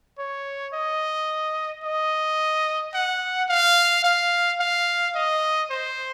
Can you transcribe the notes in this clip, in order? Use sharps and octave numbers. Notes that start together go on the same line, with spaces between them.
C#5
D#5
D#5
F#5
F5
F5
F5
D#5
C5